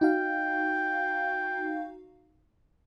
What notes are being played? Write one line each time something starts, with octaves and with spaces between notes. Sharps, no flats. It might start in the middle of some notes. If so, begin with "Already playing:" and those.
D#4 F#4 F5 G5